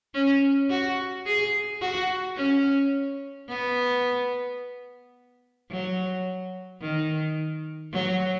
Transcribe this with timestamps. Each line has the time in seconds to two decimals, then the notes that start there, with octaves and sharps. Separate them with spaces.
0.14 C#4
0.70 F#4
1.26 G#4
1.81 F#4
2.36 C#4
3.48 B3
5.71 F#3
6.81 D#3
7.93 F#3